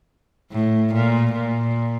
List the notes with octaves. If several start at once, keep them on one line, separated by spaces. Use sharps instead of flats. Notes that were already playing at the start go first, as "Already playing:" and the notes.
A2
A#2
A#2